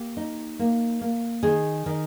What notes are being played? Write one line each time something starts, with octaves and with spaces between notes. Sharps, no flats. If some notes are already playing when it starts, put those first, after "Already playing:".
Already playing: A#3 G4
D#4
A#3
A#3
D#3 G#4
D#3